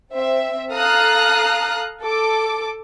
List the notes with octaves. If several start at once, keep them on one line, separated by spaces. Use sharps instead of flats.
C4 E5
A4 F5 A#5 D#6 F6 F#6
A4 D6